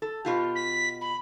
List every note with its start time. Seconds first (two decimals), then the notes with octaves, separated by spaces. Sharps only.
0.02 A4
0.25 B2 F4 G4
0.55 B6
1.01 B5